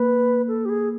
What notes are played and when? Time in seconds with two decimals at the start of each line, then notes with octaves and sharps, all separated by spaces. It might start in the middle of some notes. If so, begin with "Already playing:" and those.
Already playing: A#3 B4
0.48 A4
0.65 G4
0.69 G#4